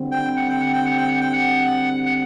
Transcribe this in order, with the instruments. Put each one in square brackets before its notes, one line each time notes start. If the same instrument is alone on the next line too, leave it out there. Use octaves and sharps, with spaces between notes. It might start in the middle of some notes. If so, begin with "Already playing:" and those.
Already playing: [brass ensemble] D3 G3 C4 F#4
[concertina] G5
F#5
G5
F#5
G5
F#5
G5
F#5
G5
F#5
F#5